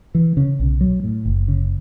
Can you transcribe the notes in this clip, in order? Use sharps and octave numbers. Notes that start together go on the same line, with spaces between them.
E3
C#3
B1
F#3
A2
F#1
C#3